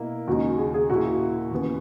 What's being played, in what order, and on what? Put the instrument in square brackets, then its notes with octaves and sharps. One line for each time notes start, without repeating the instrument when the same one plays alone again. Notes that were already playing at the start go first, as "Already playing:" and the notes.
Already playing: [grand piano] B2 A#3 E4
[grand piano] D#2 C#3 G#3 D#4 [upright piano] F#4
[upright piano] G#4
G#4
[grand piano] A#2 A#3 E4 [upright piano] F#4
[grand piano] D#2 C#3 E3 B3